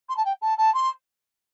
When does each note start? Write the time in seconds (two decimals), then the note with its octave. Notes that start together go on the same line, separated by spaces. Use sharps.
0.09 C6
0.16 A5
0.25 G5
0.41 A5
0.57 A5
0.74 C6